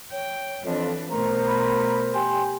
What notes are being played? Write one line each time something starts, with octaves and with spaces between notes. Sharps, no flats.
C#5 G5
F2 E3 D4
B2 A3 A#4 C5 A#5
B5
G4 G5 G#5 C6